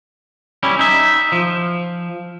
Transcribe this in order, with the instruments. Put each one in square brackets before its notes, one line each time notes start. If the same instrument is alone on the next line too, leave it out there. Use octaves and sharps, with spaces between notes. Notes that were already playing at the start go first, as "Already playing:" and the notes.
[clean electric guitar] G3 C#4 E4
D#4 E5
F3